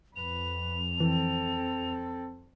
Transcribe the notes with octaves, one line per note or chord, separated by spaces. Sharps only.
F2 B4 F7
E3 C4 A4